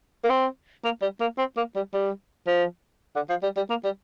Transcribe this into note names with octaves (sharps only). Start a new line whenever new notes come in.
A#3
C4
A#3
G3
A#3
C4
A#3
G3
G3
F3
D3
F3
G3
G3
A#3
G3